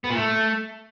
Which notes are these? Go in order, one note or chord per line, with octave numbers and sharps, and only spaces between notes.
B3
A#2
A3